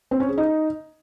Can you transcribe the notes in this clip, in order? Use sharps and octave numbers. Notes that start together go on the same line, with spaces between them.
C4
C#4
G#4
D#4